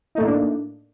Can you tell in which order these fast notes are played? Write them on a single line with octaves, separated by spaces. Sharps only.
D#4 A3 A2 A#3 D4